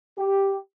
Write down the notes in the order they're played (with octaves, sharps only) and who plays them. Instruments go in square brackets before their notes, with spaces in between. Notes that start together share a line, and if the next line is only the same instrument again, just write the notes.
[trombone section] G4